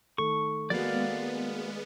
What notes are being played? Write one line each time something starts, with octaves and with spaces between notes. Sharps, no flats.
D#3 A3 A4 C#6
G#3 A#3 B3 F#4 B4 D5 F5